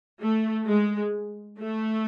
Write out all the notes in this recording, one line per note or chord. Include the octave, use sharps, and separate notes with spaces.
A3
G#3
A3